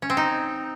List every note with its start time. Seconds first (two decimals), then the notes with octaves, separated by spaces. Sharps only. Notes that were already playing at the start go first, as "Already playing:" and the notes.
0.02 C#4
0.10 C4
0.17 D#4